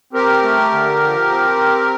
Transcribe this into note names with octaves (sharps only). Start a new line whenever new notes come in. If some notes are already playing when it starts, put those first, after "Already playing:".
C4 G4 A#4
A3
D3
F3
C4